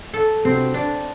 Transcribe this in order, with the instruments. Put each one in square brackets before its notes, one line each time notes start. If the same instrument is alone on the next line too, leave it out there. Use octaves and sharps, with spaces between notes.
[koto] A4
[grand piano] C3 G3 D4 F#4 [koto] C4
[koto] D4